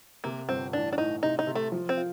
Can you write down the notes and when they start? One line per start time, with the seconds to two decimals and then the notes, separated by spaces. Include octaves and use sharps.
0.24 C3 A#3
0.48 G1 C4
0.73 A1 D4
0.93 D4
0.98 A2 D#4
1.23 C3 D#4
1.39 D#4
1.47 C3
1.55 A3
1.72 F3
1.89 C4
1.97 F4